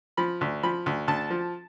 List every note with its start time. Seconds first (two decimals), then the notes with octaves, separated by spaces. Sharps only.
0.17 F3 B5
0.41 D2
0.63 F3 B5
0.86 D2
1.08 D2 A5
1.30 F3